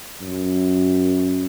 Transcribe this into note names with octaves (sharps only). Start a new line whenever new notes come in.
F#2